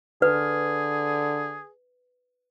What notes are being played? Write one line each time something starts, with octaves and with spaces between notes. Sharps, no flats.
D3 G#4 B4